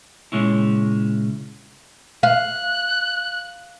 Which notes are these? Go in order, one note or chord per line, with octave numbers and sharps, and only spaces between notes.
A#2 C#3 G#3 C#4 E4
F5 F#6